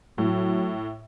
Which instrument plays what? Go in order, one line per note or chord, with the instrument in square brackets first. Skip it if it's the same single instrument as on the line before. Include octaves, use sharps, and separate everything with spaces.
[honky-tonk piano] A2 [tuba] F#3